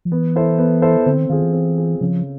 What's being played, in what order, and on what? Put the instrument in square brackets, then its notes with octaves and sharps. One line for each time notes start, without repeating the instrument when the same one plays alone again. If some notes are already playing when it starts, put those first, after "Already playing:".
[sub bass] F3
[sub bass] E3 [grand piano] B3
[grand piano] E4 A4 C5
B3
E4 A4 C5
[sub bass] D3 [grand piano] C4
[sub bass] D#3
[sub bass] D#3 [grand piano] F4 G#4
[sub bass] E3
[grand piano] C4
F4 G#4
[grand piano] C#3 [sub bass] F3